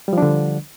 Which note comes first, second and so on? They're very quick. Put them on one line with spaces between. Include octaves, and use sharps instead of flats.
G3 F3 D4 D3